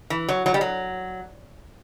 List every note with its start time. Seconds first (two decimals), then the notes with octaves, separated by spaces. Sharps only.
0.10 E3
0.29 F#3
0.46 F#3
0.54 G3
0.61 F#3